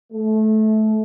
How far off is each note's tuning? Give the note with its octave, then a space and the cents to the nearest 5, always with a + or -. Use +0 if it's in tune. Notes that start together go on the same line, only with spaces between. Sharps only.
A3 -20